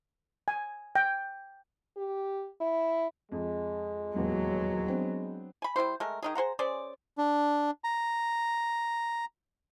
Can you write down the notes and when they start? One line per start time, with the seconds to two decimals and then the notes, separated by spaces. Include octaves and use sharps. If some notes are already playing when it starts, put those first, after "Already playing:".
0.48 G#5
0.95 G5
1.97 G4
2.61 E4
3.32 F2 G#3
4.16 D#1 G#1 E2 F#3
4.86 B3 C4 D4
5.62 G#5 B5
5.76 G3 A#3 E4 C5
6.00 G#3 A3 A#4
6.23 D#3 D#4 G#4
6.35 G#4 C5 F#5 A#5
6.59 C#4 G#4 C5 D5
7.18 D4
7.84 A#5